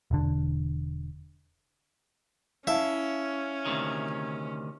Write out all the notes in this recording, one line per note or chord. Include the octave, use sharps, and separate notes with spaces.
E1 D3
C#4 E4 E5 F5 A5
D2 C3 D#3